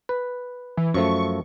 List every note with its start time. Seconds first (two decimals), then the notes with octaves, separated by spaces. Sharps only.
0.09 B4
0.77 E3
0.94 F#2 F3 A3 C#6